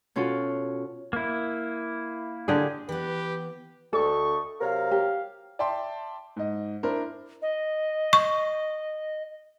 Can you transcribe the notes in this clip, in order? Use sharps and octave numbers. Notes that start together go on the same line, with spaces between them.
B2 C#4 F4 F#4 A4
A#3 E4
D3 G4 G#4
E3 B3 G4 B4
D2 A3 A4 D#5 C#6
C3 F#3 A#4 F5
G4
D5 E5 G5 A5 C6
G#2 D#5
D4 E4 A#4 C5
D#5
C#6